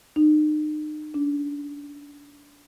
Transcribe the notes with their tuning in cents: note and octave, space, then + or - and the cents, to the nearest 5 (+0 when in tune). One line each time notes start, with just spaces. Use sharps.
D#4 -40
D4 -30